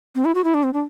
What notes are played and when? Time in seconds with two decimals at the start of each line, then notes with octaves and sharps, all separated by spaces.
0.15 C4
0.25 E4
0.35 F#4
0.44 E4
0.54 D4
0.63 C4
0.73 D4